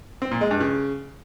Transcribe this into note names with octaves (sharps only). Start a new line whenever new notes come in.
C4
A#2
G#3
G2
C#3